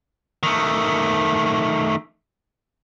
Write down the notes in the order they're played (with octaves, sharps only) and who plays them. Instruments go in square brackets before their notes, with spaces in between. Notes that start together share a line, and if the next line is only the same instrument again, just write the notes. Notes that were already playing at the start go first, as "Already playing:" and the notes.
[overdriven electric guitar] D#3 A3